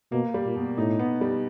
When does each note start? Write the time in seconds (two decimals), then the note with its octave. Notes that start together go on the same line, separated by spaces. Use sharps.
0.12 B2 A#3
0.34 G3
0.45 A#2
0.56 B2
0.78 A2 D#4
0.99 B3
1.21 G3